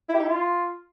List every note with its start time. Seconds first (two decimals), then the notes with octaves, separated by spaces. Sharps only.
0.09 E4
0.14 G4
0.20 D#4
0.25 E4
0.30 F4